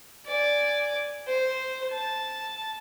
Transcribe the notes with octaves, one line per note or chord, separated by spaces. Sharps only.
D5 G#5
C5
A5